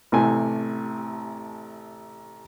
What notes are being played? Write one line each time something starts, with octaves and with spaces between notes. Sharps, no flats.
A1 C3 A3 G#5